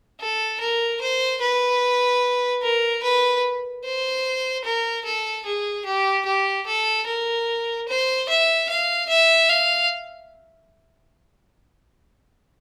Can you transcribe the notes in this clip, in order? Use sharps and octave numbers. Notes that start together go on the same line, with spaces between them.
A4
A#4
C5
B4
A#4
B4
C5
A#4
A4
G#4
G4
G4
A4
A#4
C5
E5
F5
E5
F5